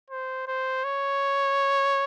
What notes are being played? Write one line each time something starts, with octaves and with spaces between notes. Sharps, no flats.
C5
C5
C#5